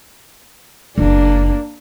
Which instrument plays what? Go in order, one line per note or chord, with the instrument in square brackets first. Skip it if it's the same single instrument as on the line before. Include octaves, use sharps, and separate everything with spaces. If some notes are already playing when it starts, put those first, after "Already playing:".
[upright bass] F#1 [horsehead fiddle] A#3 D4